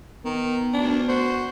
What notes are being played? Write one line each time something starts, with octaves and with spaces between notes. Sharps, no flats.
D#3 B3
D2 D4
F#4 C5